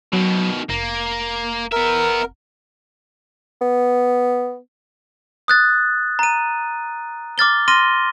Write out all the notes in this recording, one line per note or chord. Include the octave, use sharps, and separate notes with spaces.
B2 D#3 F#3
F1 A#3
B3 A#4 E5
B3
D#6 F#6 A6
A#5 D#7
D6 F6 A6 G7
C6 F6 A#6 D#7 G7